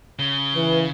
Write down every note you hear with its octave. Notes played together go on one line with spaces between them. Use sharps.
C#3 G7
E3 B4